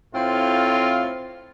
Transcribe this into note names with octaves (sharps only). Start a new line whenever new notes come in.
A2 C4 F4